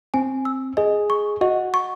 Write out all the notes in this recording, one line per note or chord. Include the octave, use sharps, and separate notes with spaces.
C4 G#5
E6
G#4 D#5
C#6
F#4 D#5
C#6